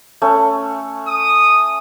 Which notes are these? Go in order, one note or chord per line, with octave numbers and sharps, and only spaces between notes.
A3 C#4
D#6